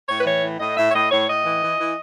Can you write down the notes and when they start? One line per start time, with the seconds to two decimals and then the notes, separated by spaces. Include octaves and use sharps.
0.08 A2 C#5
0.20 B4
0.25 E3 C#5
0.42 A2
0.60 A2 D#5
0.76 A2 E5
0.89 C#5
0.94 A2 D#5
1.11 A2 C#5
1.28 A2 D#5
1.45 E3
1.62 E3
1.79 E3